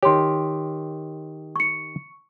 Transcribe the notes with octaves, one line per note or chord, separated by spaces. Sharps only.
D#3 G4 C#5 C6
C#6 C#7